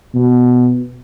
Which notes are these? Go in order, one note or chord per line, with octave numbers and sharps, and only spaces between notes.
B2